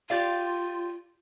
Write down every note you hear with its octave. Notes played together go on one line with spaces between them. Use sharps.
F4 G4 D5 F5